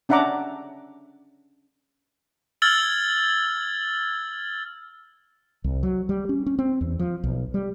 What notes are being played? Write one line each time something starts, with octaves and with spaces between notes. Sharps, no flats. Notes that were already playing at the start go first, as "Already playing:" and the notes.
C#4 D4 E5 F#5 A#5 D6
E6 F6 G#6 A6 F#7 G7
C2
F#3
G3
C#4
C#4
C4
E2
F3
B1
G3